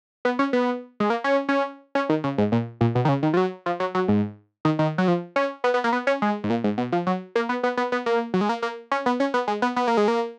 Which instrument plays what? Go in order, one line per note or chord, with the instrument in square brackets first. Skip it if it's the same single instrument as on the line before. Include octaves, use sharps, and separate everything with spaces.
[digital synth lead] B3
C#4
B3
G#3
A#3
C#4
C#4
C#4
D#3
C#3
G#2
A#2
A#2
B2
D#3
C#3
D#3
F3
F#3
F3
F#3
F#3
G#2
D#3
D#3
F#3
F3
C#4
B3
B3
A#3
B3
C#4
G#3
G#2
A#2
G#2
B2
F3
F#3
A#3
B3
B3
B3
B3
A#3
F#3
G#3
A#3
A#3
C#4
B3
C#4
B3
G#3
B3
B3
A#3
G#3
A#3